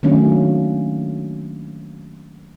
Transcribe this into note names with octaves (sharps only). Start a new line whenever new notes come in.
D#3 F#3 A3 A#3 C#4 D4